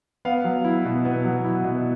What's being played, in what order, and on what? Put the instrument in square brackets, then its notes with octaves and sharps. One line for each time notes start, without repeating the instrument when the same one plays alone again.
[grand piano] B3 F5
F#3
E4
B2
B3
F#3
E4
B2